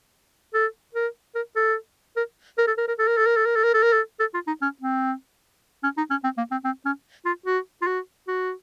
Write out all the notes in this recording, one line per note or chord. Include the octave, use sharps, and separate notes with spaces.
A4
A#4
A#4
A4
A#4
A#4
A4
A#4
A#4
A4
A#4
A4
A#4
A4
A#4
A4
A#4
A4
A#4
A4
A4
F4
D#4
C#4
C4
C#4
D#4
C#4
C4
A#3
C4
C4
C#4
F4
F#4
F4
F#4
F#4